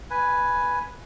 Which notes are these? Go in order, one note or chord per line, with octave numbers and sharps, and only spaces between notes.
B4 G#5